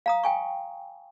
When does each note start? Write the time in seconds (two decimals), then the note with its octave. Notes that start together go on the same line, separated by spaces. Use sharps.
0.06 F5 A#5 D#6
0.24 G5 G#5 C#6